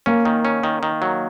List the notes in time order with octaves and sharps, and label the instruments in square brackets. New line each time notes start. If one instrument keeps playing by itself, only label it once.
[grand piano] A#3 [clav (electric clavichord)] C#4
[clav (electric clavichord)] D#3
C#4
D#3
D#3
F#3